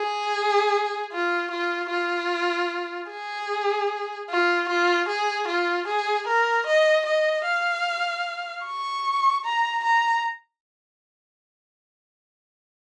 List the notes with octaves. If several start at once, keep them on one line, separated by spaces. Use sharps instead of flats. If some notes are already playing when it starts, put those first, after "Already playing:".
Already playing: G#4
F4
F4
F4
G#4
F4
F4
G#4
F4
G#4
A#4
D#5
D#5
F5
C#6
A#5
A#5